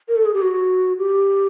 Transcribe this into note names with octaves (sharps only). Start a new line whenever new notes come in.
A#4
A4
G#4
G4
F#4
G4